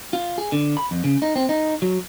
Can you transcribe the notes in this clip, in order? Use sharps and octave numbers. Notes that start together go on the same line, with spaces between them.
F4
G#4
D3
B5
F2
C#3
D#4
C4
D#4
F#3